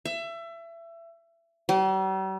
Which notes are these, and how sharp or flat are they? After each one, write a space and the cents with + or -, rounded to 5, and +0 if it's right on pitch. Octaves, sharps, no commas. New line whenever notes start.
E5 +25
G3 -45